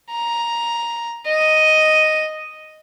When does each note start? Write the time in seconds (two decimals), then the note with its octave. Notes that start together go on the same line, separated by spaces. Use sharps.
0.11 A#5
1.26 D#5